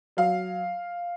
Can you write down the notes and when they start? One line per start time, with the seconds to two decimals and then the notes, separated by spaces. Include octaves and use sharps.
0.17 F#3 F5